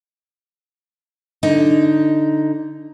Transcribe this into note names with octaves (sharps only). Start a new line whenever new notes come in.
D3 D#4